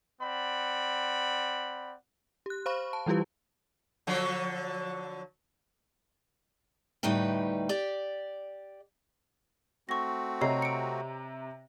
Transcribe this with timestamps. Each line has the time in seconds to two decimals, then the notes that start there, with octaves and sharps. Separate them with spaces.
0.22 C4 D5 F#5 B5
2.46 G4 F#6
2.66 C5 F5 B5 C#6
2.93 A5
3.06 E3 G3 E4 F4 G4 B4
4.07 D3 F3 F#3
7.03 D2 A2 G3 D#4 B4 G5
7.69 G4 D5
9.89 A3 C4 F#4 C#6 A#6
10.41 C3 C#5 D#5 A#5 C7
10.62 C#7 D7